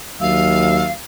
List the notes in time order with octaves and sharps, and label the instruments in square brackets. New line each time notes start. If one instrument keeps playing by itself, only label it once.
[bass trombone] D#2 [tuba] F#3 [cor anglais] E5 [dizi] F5